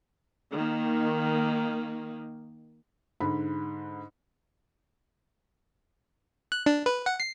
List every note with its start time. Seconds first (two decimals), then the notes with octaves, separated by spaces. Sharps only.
0.52 D#3 A#3
3.20 G#2 D3 B5
6.52 F#6
6.66 D4
6.86 B4
7.06 F#5
7.20 C7